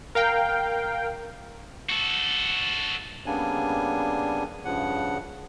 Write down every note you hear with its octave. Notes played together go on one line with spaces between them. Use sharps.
A#4 F5 G5
F#4 A4
C#3 G3 A#3 B3 D4 G#5
G2 C#3 F3 F#5